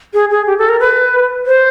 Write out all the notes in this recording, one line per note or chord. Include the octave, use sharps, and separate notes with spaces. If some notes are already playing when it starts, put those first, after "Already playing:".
G#4
G#4
G4
A4
A#4
B4
C5